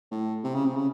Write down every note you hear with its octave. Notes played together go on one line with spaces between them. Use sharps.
A2
C3
C#3
C3
C#3